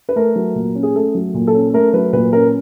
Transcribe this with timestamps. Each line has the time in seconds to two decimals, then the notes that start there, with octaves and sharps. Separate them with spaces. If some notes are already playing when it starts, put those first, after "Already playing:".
0.09 B4
0.16 A3 A#4
0.36 F#3
0.55 A#2
0.75 C#4
0.83 G#4
0.95 A3 A4
1.15 F#3
1.34 A#2
1.47 A4
1.54 C#4
1.74 A3 A#4
1.93 F#3 B4
2.13 A#2 B4
2.33 C#4 A#4